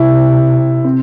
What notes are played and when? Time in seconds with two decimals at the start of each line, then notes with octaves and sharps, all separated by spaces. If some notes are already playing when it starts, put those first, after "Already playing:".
Already playing: C3 E4
0.85 C4